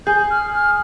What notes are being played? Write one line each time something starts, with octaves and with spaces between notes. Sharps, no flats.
G#4 G6
F6
F6